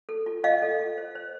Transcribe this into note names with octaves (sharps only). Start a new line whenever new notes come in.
A4
F4
F4 D#5 F5
A4
F4
C5
C5